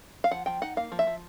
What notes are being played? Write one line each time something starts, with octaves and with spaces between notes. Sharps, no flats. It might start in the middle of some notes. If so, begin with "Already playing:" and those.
F5
F3 F#5
F3 G5
D#4 F#5
A#3 F5
F3
E5
F3